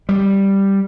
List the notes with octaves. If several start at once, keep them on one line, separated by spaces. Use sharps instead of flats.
G3